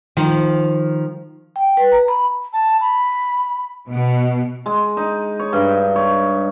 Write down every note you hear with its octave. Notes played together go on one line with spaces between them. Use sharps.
D#3 F3
G5
B4
A#5
B5
A5
B5
B2
G#3
D#4
C#5
G2
C#5